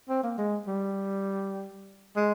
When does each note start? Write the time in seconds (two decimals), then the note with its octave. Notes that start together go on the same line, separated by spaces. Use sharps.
0.09 C4
0.24 A#3
0.38 G#3
0.67 G3
2.16 G#3